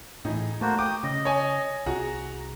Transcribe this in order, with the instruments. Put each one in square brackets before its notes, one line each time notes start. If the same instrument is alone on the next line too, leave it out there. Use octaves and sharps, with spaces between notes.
[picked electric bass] A2 E3 [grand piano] D#4 [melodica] G#4
[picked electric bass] A3 [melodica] A#3 F#4 C5
[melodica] G5 D#6 [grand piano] D6
[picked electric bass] C#3 [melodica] D#5
[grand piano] C#5 G#5
[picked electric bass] C2 [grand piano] F#4 G#4 [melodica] A#5